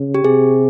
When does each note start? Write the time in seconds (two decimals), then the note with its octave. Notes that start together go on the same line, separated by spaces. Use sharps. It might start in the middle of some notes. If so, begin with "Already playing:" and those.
Already playing: C#3
0.14 G4
0.24 C3 G#4